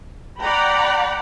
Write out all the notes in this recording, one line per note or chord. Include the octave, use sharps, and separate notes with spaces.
D5 F#5 G5 A#5 B5